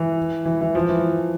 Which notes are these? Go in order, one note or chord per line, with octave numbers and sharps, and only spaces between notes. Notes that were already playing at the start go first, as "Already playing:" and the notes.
Already playing: E3
E3
E3
F3
E3